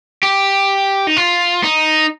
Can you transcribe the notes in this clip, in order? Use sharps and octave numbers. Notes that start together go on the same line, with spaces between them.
G4
D#4
F4
D#4